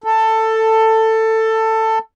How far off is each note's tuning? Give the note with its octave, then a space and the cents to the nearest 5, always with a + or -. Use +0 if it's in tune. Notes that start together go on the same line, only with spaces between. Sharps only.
A4 +15